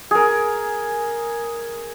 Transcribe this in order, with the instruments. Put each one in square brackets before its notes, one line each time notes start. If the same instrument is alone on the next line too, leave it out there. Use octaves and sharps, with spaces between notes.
[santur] G#4 A#4